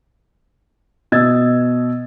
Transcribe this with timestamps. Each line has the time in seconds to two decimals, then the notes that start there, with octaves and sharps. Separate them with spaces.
1.12 B2 D#5 E6 G#6 A6